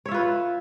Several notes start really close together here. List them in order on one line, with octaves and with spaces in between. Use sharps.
C#5 E5 F4 B4